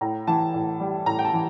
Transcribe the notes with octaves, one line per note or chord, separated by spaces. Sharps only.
A2 A#5
E3 A5
A2
G3
A2 A#5
G5
A5
E3